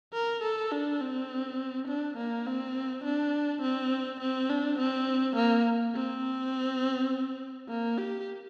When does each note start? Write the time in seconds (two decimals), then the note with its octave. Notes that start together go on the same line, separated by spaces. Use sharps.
0.13 A#4
0.43 A4
0.72 D4
1.01 C4
1.88 D4
2.17 A#3
2.47 C4
3.05 D4
3.63 C4
4.20 C4
4.50 D4
4.79 C4
5.36 A#3
5.95 C4
7.69 A#3
7.98 G4